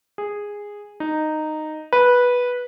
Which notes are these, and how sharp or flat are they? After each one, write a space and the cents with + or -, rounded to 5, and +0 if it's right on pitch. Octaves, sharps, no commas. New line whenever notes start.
G#4 -10
D#4 -10
B4 -10